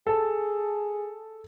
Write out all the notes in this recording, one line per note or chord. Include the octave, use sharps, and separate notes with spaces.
G#4 A4 A5